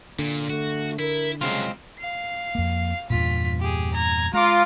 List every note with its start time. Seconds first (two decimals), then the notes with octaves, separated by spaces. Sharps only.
0.19 A#2 D3
0.50 A3 F#4
0.99 E4 A#4
1.41 C2 C#3 F#3 G#3 C4 F4
1.99 F5 C7
2.55 F2 A#3
3.10 E2 G2 A#2 F4 B6
3.60 G4 G#4
3.94 A#5 G#6
4.33 G#3 F4 A#5 D6